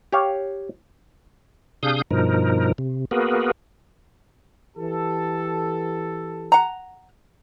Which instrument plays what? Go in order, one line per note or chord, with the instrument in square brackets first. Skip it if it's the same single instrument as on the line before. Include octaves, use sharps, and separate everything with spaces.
[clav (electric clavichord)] G4 C#5 F5
[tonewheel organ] C3 D4 G#4 F5 D#6 G6
G2 B2 F3 D#4 A#4
C3
A#3 B3 F#4 G#4 A#4 B4
[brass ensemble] E3 G4 A4
[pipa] F#5 A#5